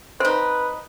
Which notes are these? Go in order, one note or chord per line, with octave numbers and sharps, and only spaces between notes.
C4 D#4 B4 C5